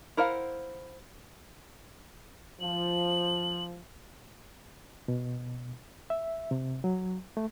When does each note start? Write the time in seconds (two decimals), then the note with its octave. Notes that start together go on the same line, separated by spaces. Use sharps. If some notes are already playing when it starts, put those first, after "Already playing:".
0.17 E4 A#4 C5 F5 F#5
2.60 F3 F#7
5.08 B2
6.10 E5
6.51 C3
6.84 F#3
7.37 A3